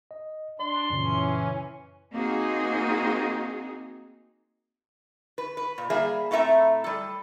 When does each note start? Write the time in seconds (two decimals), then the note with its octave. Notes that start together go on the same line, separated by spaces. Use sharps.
0.11 D#5
0.60 D4 D5 C6
0.90 F#2 A#2 C#3 E3 C#4
2.13 A#3 C4 D#4 F#4 G#4
5.38 B4
5.57 B4
5.78 A#2
5.90 G3 A#3 G#4 E5
6.31 A2 A3 C4 E5 A#5
6.84 G3 A4